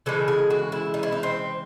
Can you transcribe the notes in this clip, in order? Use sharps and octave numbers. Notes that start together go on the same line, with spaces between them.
C#3 E3 G#3 A4
G#4
F#4
E4
D#4
E4
D#4
C4